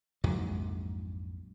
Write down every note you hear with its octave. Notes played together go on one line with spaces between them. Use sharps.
A#1 F2 G#2 F#3